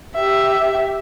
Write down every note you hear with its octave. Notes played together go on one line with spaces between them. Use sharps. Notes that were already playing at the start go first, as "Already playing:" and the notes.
G4 E5